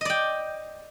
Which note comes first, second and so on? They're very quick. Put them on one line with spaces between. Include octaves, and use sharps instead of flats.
D#5 D5 G5